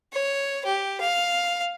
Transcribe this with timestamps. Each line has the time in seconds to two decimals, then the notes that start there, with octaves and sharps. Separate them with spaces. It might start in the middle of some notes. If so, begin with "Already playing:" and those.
0.13 C#5
0.65 G4
1.00 F5